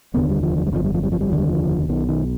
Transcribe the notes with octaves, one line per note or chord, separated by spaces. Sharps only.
F1 D#2 D3 B3
G3
F3
F3
G3
G1 F2 D3 F3
G3
F3
G3
F3
G3
F1 D#2 D3 F3
G3
F3
B1 B2 D#3
D#3